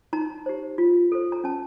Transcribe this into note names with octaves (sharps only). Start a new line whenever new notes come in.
D#4 A#5
G4 C5
F4
A4 C5
A#5
C#4 A5